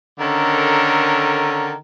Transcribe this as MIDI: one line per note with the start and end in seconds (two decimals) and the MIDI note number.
0.20 1.75 50
0.20 1.75 51
0.20 1.75 61
0.20 1.75 69
0.20 1.75 70